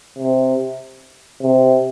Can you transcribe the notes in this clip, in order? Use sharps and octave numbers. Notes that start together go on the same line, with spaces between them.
C3
C3